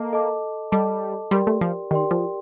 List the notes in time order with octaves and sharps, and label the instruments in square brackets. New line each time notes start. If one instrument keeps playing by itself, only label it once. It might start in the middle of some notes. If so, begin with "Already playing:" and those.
Already playing: [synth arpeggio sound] A#3 [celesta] A4 D#5 A5
[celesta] A4 D#5 A5 D6
[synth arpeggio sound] G3 [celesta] A4 D#5 A5 D6
[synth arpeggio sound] G3 [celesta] G4 A#4 D5 G5 C6
[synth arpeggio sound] A3
F3
[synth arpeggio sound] D#3 [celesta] G4 A#4 D5 G5 C6
[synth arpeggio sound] F3